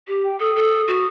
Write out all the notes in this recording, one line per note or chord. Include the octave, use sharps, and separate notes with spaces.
G4
G5
A4 D#6
A4
F#4